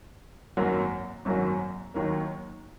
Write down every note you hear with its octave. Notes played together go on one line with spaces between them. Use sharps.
G#1 F#2 F#3 A#3 F#4
G#1 F#2 F#3 A#3 F#4
D#2 D#3 F#3 A#3